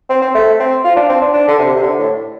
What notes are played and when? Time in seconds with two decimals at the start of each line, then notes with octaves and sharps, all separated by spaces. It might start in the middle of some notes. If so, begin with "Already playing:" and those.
0.09 C4
0.22 C4
0.35 A3
0.60 C4
0.84 F4
0.96 D4
1.09 C4
1.21 D4
1.33 D4
1.48 D3
1.59 C3
1.76 C3
1.82 D3
1.99 A2